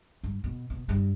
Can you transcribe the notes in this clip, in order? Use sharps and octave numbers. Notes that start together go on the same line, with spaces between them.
G2
B2
B2
G2